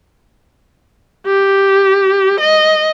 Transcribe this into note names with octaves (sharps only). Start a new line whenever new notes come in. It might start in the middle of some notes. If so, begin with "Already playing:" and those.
G4
D#5